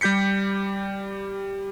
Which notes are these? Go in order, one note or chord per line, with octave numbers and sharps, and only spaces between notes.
G3 G4 G6 B6 C#7